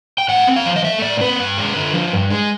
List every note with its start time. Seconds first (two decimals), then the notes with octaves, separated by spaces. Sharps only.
0.18 G5
0.29 A2 F#5
0.47 C4
0.56 F5
0.66 F3
0.76 D#5
0.85 A3 E5
1.02 A2 D5
1.21 C4 B4
1.39 G2
1.58 G#3
1.76 D3
1.94 F3
2.13 G2
2.30 G#3